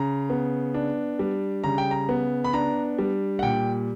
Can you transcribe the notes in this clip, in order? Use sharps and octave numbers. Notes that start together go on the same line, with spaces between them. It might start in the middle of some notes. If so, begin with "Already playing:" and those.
Already playing: C#3 A#5
B3
D4
G3
C#3 A#5
G5
A#5
B3
B5
D4 A#5
G3
F#5
A#2 G5